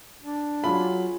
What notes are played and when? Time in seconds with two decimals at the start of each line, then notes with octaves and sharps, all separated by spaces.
0.22 D4
0.64 F#3 F4 G#4 B5